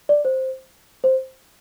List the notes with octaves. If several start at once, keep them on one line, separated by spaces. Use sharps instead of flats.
D5
C5
C5